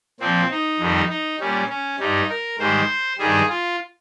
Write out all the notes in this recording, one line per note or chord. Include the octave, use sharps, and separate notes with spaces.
A#2 F3 C4
D#4
F2 D#3 G3
D#4
A#2 G3 C#4
C#4
G2 G3 D#4
A#4
G#2 D#3 G3 C5
G2 D#3 G3 G#4
F4